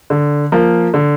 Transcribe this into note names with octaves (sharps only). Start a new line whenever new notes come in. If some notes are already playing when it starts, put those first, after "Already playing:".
D3
F3 A#3
D3